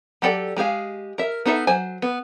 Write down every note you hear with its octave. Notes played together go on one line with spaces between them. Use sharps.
F#3 G4 A4 D5 G5
G#3 G4 G#4 F5
A#4 E5
B3 D#4 A4 E5
F#3 C5 G#5
B3